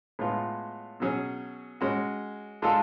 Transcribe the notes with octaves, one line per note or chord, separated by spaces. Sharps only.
A2 G#3 B3 F4
B2 F#3 C#4 G#4
G#3 C#4 F#4
G#3 D4 F4 A4